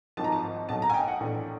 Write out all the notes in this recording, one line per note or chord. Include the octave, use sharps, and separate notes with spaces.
G#1 G#2 F3 A5
A#5
A5
B1 B2 F#3 A5
A#5
G#5
G5
F#5
A#1 A2 E3